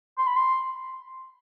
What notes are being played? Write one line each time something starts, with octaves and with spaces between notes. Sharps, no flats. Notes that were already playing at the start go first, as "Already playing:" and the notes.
C6
B5
C6